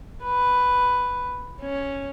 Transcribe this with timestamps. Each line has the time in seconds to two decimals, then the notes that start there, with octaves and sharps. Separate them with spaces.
0.24 B4
1.62 C#4